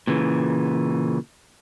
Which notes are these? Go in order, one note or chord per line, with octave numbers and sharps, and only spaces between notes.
A#2 C#3 E3